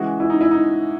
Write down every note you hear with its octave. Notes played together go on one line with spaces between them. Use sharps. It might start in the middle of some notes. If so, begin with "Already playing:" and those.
Already playing: C#3 E3 G#3 F#4
E4
D#4
E4
D#4